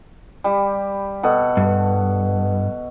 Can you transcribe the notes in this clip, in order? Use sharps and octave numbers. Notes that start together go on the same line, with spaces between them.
G3 G4
B2 A4 F#5
G2